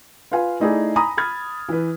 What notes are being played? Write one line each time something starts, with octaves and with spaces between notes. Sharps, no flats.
F4 B4 F5 G#5
A3 D#4 E4 G#4 D5
G#5 A#5 B5 D#6
B5 F6 G#6 A6
E3 B4